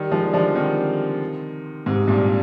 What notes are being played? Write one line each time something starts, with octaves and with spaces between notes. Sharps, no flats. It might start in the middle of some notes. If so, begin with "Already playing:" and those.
Already playing: D#3 G3
F3 G#3
G3
D3 F3
C3 D#3
G#2 C3
G2 A#2